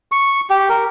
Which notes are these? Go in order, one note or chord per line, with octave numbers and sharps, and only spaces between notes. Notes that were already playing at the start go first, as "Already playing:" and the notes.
C#6
G4
A#4